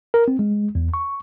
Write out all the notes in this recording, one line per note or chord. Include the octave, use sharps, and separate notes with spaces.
A#4
C4
G#3
E2
C#6